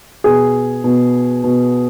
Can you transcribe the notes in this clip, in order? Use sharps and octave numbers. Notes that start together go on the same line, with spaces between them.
B2 G#4
B2
B2